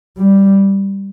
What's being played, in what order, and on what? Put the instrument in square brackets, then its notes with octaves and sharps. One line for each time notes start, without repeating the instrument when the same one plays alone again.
[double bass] G3